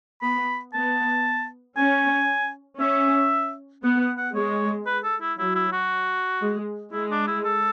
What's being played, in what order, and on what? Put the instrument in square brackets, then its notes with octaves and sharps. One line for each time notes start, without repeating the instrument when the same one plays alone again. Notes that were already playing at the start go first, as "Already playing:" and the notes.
[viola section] B3 [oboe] B5
[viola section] B3 [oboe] A5
[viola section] C#4 [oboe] G#5
[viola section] C#4 [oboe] E5
[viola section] B3 [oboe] F#5
[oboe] F#5
F#5
[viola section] G#3 [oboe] C#5
[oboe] B4
A4
E4
[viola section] F#3 [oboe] E4
[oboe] E4
F#4
[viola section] G#3
[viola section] G#3 [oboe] E4
[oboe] D4
E4
A4